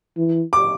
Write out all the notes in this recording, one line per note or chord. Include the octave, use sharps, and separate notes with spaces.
E3
D6